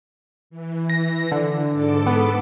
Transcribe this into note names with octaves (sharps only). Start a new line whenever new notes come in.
E3
A#6
D3
G#2 A4 D6
B3